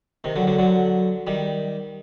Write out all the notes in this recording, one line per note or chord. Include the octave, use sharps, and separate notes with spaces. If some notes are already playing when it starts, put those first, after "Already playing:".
C3 D#3
D3 F#3
D3 F#3
D3 F#3
D#3 G3